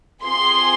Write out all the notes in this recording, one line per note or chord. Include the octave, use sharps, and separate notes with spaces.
C4 F4 G#4 C6